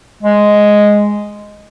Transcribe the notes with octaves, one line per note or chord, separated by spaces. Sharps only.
G#3